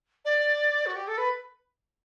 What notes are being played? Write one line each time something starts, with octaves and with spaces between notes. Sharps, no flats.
D5
F#4
G4
A4
B4